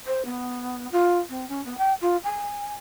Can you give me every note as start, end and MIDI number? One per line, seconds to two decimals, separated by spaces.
0.07 0.23 72
0.25 0.87 59
0.92 1.18 65
1.29 1.45 60
1.49 1.63 61
1.65 1.77 59
1.77 1.93 79
2.01 2.17 65
2.24 2.76 80